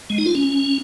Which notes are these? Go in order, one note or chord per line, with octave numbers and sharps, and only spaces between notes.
G#3
D#4
F4
C#4